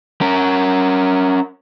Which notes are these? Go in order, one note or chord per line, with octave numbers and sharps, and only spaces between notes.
C#4 A#4